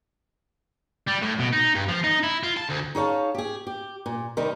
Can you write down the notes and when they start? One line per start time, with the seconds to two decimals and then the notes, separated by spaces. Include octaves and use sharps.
1.08 G3
1.22 A2
1.39 B2
1.53 D#4
1.75 G2
1.88 F3
2.04 D#4
2.23 E4
2.43 F4
2.57 A5
2.69 D2
2.95 D#4 G#4 C#5 F5 A5
3.35 G4 G#4
3.67 G4
4.06 A#2
4.37 C3 D#3 G3 D#4